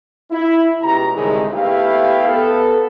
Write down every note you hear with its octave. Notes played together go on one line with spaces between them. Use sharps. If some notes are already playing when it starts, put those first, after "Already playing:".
E4
C#2 B2 G4 A#5
C2 A2 D3 D#3 G#3
A3 B3 E4 G4 F5 G5
B3 A4